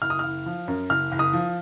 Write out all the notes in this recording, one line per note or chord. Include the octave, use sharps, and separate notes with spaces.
F#1 F6
D#6
F#1 F6
F3
F#2
F#1 F6
F#1
D#6
F3